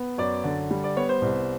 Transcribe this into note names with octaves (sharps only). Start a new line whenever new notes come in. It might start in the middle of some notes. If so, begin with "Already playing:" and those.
Already playing: B3
F#2 D5
D3
G3
D5
B3 C#5
C5
C2